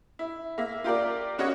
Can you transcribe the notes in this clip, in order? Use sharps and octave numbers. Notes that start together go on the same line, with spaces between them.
E4
A#3 E5
F4 G4 A#4 D5
C#4 F#4 C#5 D#5 F#5